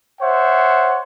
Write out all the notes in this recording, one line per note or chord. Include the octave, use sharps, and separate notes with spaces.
C5 C#5 E5 F#5